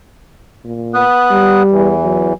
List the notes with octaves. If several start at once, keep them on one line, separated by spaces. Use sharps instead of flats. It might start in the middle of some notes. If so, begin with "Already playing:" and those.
A#2
B3 D#6 F#6
G3
E2 E3
F#3